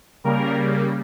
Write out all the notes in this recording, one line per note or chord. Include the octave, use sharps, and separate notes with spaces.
C#3 G3 A#3 A#4